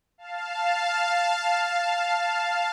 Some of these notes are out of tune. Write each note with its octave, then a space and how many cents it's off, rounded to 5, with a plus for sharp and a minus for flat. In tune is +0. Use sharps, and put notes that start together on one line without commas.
F5 +0 A5 +0